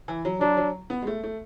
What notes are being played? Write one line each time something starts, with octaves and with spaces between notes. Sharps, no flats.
E3
F#3
F#3 D4
F#3
B3
G#3
A3
A3